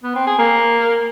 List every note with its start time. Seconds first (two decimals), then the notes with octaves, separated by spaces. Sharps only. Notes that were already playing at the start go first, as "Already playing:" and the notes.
0.03 B3
0.15 C4
0.27 G#4
0.38 A#3